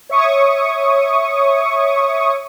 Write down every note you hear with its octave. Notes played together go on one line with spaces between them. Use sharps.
C#5 E5 C#6 D#6